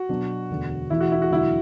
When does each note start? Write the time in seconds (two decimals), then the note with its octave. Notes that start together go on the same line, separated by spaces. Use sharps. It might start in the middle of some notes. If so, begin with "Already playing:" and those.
Already playing: F#4
0.09 B2 F#3 B3 D4
0.50 E1 D2 D3 B3
0.90 E1 E2 E3 A3 E4
1.00 F#4
1.12 E4
1.22 F#4
1.30 E1 D2 D3 F#3 E4